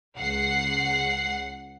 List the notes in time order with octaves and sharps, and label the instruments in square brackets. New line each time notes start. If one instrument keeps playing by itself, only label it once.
[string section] C#2 F#5 C7